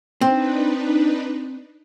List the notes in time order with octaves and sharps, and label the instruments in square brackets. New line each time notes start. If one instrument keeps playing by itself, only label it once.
[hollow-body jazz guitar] C4 [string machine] D4 D#4 B4